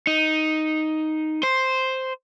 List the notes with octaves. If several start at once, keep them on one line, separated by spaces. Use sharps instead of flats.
D#4
C5